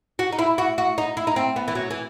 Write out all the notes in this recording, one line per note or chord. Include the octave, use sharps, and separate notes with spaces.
F#4
D#4
E4
F#4
F#4
D#4
E4
D#4
C4
B3
E3
F#3
E3